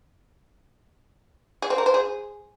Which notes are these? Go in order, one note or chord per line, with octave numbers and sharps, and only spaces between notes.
G#4
C4
A#4
C5
G#4